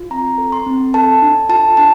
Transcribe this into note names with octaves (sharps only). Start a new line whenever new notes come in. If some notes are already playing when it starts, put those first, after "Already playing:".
Already playing: F4
C4 A#5
A4
C6
C4
A4 A5
D4
F4 A5
D4 A5